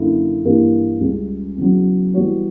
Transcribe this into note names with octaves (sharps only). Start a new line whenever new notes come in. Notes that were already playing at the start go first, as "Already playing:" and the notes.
Already playing: F#2 D3 A#3 E4
G2 E3 A#3 E4 G4
C#2 C#3 G3
E2 C#3 F#3
E3 G3 B3 F#4 C#5